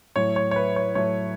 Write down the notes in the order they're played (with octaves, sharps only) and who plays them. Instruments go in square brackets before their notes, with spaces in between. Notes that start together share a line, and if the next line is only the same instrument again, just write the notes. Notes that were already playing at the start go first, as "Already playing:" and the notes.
[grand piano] A2 F#3 A3 C#5
C#5
C#5
B4
C#5
A2 F#3 A3 C#5